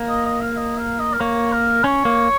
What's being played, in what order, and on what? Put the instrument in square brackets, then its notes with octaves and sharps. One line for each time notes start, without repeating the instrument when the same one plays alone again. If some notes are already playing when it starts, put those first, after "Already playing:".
Already playing: [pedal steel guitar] A#3
[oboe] D#5
D#5
F5
D#5
F5
D#5
A#4
[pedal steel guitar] A#3 [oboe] C#5
[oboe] A#4
[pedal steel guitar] C#4 [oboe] C#5
[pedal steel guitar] A#3